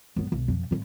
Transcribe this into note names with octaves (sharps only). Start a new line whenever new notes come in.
F#2 B3
B1
F2 C3
F2 A2